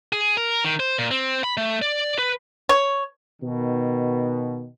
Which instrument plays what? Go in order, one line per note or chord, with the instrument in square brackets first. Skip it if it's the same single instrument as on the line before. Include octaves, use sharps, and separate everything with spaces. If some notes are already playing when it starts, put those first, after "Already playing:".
[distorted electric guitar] G#4
A#4
D#3
C5
A#2
C4
B5
A3
D5
B4
[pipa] C#5
[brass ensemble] B2 D#3